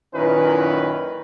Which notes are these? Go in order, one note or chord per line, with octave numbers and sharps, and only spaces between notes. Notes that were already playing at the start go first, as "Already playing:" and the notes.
F#2 A#2 D#3 C#4 E4 B4